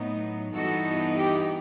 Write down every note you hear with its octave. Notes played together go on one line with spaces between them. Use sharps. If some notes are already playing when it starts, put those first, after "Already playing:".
Already playing: A2 F#3 B3 D#4
G2 E3 B3 D#4 F#4 A4
G4